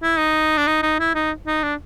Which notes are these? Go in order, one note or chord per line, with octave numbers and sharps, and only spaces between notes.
E4
D#4
D4
D#4
D#4
E4
D#4
D#4
D4